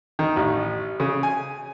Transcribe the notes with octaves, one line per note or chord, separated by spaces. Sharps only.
D#3
A1
C#3
G#5